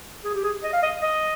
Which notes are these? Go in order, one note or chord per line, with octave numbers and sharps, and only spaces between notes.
G#4
G4
G#4
D#5
F5
D#5
D#5